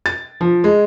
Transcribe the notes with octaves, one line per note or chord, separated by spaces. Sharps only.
A6
F3
G#3